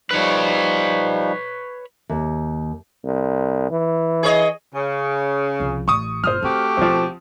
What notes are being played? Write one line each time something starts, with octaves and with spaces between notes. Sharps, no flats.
F3 G3 D#4 B4 C#5
D#2
C2
E3
G#4 C#5 D#5
C#3
C2 F3
A1 C#6 D#6
G1 A#2 C5 D#6 F6
A3 C4 F#4 G4
B1 F3 C4 E4